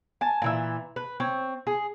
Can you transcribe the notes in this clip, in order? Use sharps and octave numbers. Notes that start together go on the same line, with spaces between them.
G#5 A5
A#2 E3 E5
B4
C4 C#5
G#4